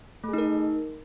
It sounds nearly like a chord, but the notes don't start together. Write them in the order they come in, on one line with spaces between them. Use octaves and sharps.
A3 G#4 D#4 A#4